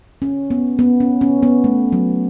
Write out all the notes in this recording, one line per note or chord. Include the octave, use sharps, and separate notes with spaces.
C#4
B3
B3
C#4
C#4
B3
A3
F#3